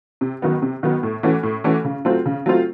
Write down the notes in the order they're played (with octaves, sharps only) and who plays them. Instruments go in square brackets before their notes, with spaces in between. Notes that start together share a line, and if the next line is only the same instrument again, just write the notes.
[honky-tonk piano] C3
D#3 F#3 B3
C3
D#3 F#3 B3
A2
E3 A3 C#4 F#4
A2
E3 A3 C#4 F#4
C#3
F#3 A3 C4 F4
C#3
F#3 A3 C4 F4